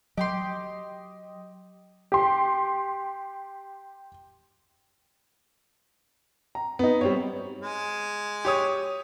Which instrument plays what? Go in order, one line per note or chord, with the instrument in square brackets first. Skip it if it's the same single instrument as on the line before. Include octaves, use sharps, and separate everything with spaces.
[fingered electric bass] F#3 [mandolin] G4 G5 C6 [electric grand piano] D#5
[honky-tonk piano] G4 C6
[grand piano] A#5
B3 D#4
G3 C4 C#5
[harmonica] G#3
[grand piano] G4 C#5 D#6